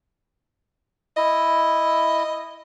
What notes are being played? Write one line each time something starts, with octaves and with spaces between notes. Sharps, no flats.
E4 D#5